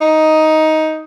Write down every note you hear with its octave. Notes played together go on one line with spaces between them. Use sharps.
D#4